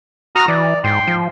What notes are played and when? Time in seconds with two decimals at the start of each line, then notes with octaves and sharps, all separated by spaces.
0.36 F#4 A#5 D#6 F6
0.48 E3 D5
0.84 G#2 G5 C6
1.07 F3